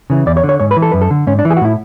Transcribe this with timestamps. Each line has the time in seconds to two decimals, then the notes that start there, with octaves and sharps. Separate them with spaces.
0.10 C#3 E3
0.26 E2 D5
0.37 C#5
0.44 D3
0.49 C#5
0.60 G#2 C#5
0.71 B4
0.77 E3
0.82 A4
0.92 F#2 B4
1.02 A4
1.11 D3
1.27 G#2 C#4
1.39 D4
1.45 E3
1.51 G#4
1.57 F#4
1.61 A2 E4